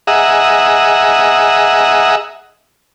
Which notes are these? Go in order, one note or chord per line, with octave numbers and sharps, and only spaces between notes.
G#4 D#5 E5 F#5 A#5